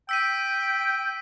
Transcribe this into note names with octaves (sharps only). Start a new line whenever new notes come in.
G5 E6 B6 D#7